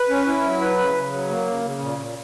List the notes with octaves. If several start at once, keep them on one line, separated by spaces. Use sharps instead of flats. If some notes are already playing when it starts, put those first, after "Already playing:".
Already playing: B4
C#4
E4
F#3
B4
C#3
C#3
F#3
A#3
C#3
C#3
A#2
A#2